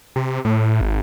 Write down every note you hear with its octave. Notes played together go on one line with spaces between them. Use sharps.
C3
A2
G#1